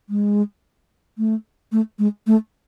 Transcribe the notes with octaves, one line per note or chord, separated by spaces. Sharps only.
G#3
A3
A3
G#3
A3